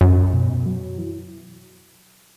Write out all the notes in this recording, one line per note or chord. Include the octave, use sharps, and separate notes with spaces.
F#2
B2
F#3
E3